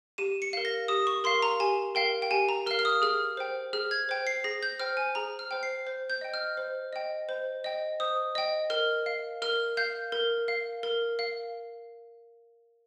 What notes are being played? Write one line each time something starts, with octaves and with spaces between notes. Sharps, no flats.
G4 D#7
C#7
A#4 F5
A#6
G4 D#6
C#6
A#4 F5 C6
A#5
G4 G#5
A#4 F5 G5
G5
G4 G#5
A#5
A#4 F5 F6
F6
D#6
G#4 F6
C5 G5
G#4 F6
G#6
C5 G5
C7
G#4 A#6
G6
C5 G5 F6
G#5
G#4 A#5
F6
C5 G5
C7
C5
G6
D#5 G5
F6
C5
D#5 G5
C5
D#5 G5
C5 D#6
D#5 G5
A#4 F6
F5
A#4 F6
F5 G6
A#4
F5
A#4
F5